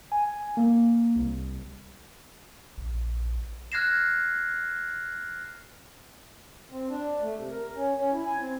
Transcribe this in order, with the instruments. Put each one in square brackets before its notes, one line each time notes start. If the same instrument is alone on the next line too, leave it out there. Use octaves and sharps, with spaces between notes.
[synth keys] G#5
A#3
C2
[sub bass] A#1
[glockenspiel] F6 F#6 G#6 A#6 C7 E7
[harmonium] C4
D4
A3
C3
A#4
C#4
C#4
E4
G#5
C4